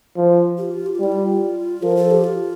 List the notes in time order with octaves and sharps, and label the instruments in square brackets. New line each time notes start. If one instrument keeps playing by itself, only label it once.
[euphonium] F3
[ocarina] G4
F4
G4
F4
[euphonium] G3 [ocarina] E4
[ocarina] F4
[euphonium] F3 [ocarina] A#4
[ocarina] A4
G4
F4